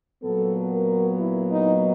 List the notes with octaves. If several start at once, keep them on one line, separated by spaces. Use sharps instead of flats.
A#2 F#3 B3 A4
A#4
E4
D#4